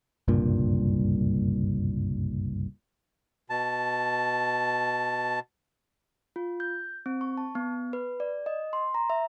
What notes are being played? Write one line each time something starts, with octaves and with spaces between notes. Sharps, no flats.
F#1 C2 G2 A#2
B2 A5
F4
G6
C4
C#6
A5
B3
B4
D5
D#5
C6
A#5
E5